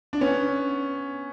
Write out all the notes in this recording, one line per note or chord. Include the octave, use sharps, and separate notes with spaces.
D4
B3 C#4